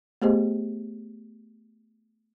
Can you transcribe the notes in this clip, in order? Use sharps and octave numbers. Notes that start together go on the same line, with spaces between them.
A3 B3 G4 G#4 C5 D#5